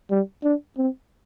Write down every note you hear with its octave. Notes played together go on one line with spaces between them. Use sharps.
G3
D4
C4